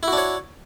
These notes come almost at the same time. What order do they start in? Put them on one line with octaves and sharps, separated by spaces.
E4 F#4 D4 C#5